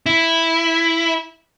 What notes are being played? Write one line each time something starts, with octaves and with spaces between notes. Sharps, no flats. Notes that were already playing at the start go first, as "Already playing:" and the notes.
E4